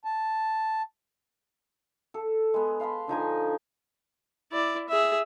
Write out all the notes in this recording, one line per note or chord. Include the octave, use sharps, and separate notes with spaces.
A5
A4
G#3 B3
F5 A5 B5 C6
D3 F3 D#4 G#5
E4 D5
G#4 E5